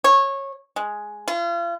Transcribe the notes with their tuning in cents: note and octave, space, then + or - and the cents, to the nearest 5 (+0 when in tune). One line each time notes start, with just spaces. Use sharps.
C#5 -20
G#3 +5
F4 -35